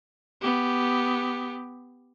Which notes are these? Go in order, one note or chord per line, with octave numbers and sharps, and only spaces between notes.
B3 G4